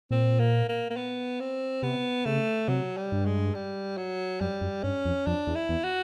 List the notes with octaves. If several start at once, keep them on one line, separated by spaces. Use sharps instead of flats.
A#2 C4
A#3
A#3
A#3
B3
C4
C3 B3
C#3 A3
C3 F#3
G3
G2
G#3
G3
F#3
F#2 G3
F#2
G2 C#4
F2
F2 D4
E2
E4
E2
F#4